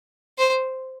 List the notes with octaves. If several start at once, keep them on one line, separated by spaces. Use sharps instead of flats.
C5